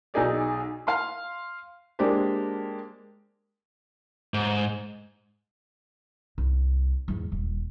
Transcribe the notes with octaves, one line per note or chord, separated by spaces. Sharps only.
B1 D#4 G#4 D5
F5 C6
G#3 A#3 D4 G4 C5
G#2
C2
E2 G#2
D#1